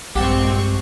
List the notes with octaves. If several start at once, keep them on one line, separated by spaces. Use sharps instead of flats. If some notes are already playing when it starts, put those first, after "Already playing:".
A#1 G2 G#3 C4 G4 F#5 A5 C#6